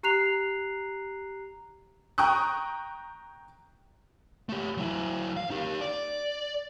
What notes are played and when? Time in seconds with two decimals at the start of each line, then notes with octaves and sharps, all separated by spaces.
0.03 G4 A#5 F#6 C7 F7
2.18 G5 A#5 C#6 D#6 F#6
4.49 A3 G4
4.77 F#3 E4
5.37 F5
5.50 D#4 G4
5.81 D5